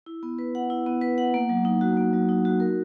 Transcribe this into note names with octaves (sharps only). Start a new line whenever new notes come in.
E4
B3
B4
F#5
E4
B3
B4
F#5
A#3
F#3
D#4
F#4
A#3
F#3
D#4
F#4
A#4